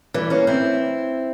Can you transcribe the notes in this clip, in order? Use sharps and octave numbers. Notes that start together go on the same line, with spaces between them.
E3 G3
A#3 C#4
C4 E4